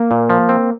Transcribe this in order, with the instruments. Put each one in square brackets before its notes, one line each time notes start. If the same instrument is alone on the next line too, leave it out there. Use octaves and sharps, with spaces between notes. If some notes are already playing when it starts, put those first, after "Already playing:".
Already playing: [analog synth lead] A#3
[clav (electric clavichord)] A#2
F3
C4